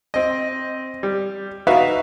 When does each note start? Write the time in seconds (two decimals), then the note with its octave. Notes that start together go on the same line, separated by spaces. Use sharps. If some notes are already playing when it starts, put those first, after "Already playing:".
0.14 C4 D#5
1.03 G3
1.67 D#4 F#4 B4 E5 F5